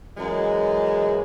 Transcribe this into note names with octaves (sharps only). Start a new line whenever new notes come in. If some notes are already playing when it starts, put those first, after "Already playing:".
F#2 E3 G#3